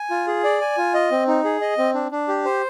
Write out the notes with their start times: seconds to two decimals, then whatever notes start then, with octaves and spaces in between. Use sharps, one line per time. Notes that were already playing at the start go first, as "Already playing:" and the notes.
Already playing: G#5
0.10 F4
0.27 G#4
0.44 D5
0.61 G#5
0.77 F4
0.94 D#5
1.11 C4
1.27 D#4
1.44 G#4
1.61 D#5
1.78 C4
1.94 D4
2.11 D4
2.28 G4
2.45 C5